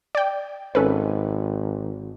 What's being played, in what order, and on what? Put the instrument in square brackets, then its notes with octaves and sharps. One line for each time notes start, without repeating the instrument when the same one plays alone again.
[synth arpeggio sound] D5 G5
[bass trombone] G#1 [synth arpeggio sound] C#4 A4 B4